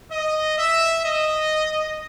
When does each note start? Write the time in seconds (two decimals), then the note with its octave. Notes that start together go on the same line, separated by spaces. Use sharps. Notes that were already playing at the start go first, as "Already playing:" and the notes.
0.11 D#5
0.57 E5
1.05 D#5